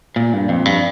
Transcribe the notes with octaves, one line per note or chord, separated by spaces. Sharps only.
A#2
G2
F2
G2